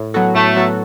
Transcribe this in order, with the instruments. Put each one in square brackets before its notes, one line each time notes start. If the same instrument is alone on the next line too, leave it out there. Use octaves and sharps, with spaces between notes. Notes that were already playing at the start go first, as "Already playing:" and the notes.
Already playing: [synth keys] A2
F#3 B3 F#4 A4
[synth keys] A2 [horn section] A3
[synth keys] F#3 B3 F#4 A4